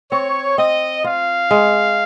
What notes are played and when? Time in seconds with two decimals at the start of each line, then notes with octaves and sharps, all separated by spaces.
0.12 C4 C#5
0.58 C4 D#5
1.04 F4 F5
1.51 G#3